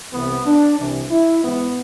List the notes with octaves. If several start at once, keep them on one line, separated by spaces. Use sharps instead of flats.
C2 C3 E3 B3
D4
C2 C3 E3
E4
G#2 E3 B3